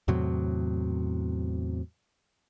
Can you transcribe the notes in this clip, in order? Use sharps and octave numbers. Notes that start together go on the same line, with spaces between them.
E2 A2 C3 F#3